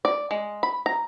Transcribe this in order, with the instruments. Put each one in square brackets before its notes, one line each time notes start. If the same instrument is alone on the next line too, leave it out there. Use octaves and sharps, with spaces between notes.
[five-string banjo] D5
G#3
B5
A#5